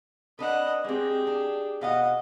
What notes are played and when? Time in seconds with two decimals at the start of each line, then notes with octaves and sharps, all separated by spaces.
0.39 D4 B4 D#5 F#5
0.84 G#3 C4 G4 G#4
1.27 D4
1.81 B2 D#5 F5 F#5